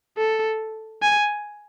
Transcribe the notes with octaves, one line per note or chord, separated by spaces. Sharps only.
A4
G#5